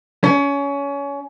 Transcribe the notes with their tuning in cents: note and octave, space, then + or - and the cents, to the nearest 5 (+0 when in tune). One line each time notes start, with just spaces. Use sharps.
C#4 +25